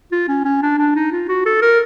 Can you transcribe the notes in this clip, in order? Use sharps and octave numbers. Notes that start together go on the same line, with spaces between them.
F4
C#4
C#4
D4
D4
D#4
F4
F#4
A4
A#4